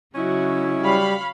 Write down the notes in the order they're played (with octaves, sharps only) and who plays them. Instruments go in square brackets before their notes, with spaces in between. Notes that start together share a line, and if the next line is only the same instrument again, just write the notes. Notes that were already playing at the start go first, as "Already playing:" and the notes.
[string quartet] C#3 F#3 [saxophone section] C#4 D#4 E4 [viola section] F#4
[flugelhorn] G3 [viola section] C#5 F5 B5